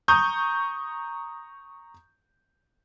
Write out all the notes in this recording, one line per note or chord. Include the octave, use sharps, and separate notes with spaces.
A#5 C#6 D#6 G6